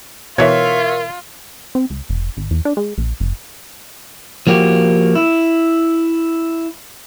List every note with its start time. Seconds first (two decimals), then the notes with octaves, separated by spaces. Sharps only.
0.38 B2 E3 F4 A#4 C#5 E5
1.75 C4
1.90 C#2
2.09 F1
2.37 G#1
2.51 E2
2.65 D4
2.77 G#3
2.98 A#1
3.20 F#1
4.47 F3 A#3 F#4 G4
5.16 E4